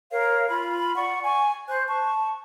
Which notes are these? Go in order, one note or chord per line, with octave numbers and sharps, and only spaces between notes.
A#4 C#5 F5
F4 B5
D5 F#5 C#6
G#5 C#6
C5 F#6
A5 C#6